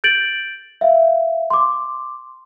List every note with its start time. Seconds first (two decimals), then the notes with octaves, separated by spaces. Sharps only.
0.04 G6 A6 D7 F#7
0.81 E5 F5
1.50 C6 D6